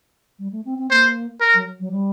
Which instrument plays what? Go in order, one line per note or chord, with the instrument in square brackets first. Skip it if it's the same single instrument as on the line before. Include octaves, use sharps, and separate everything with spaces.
[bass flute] G3
A3
C4
C4
[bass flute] A#3 [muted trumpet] C5
[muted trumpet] A#4
[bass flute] F#3
F#3
G3